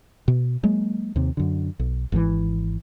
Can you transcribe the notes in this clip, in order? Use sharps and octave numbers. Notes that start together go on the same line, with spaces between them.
B2
F#3 G#3 A#3
D#2 C3
F#2 D3
B1
G#1 G#2 D#3 E3